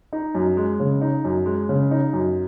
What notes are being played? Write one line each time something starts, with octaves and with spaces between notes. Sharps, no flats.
D#4
F#2
G#3
C#3
D#4
F#2
G#3
C#3
D#4
F#2